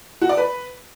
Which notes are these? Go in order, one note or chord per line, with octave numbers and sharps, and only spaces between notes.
F#4
D5
B4